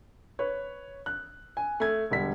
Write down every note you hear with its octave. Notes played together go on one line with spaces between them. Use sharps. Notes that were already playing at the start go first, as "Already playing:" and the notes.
B4 C#5
F#6
G#5
A3 G#6
E1 D3 G3 B6